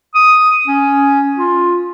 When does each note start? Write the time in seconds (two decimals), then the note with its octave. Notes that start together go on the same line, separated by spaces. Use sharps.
0.15 D#6
0.68 C#4
1.37 F4